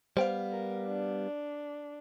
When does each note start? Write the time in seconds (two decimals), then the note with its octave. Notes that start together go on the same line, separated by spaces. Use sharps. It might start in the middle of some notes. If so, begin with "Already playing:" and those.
0.17 G3 B3 C5 F5 G5
0.51 A#4
0.86 D4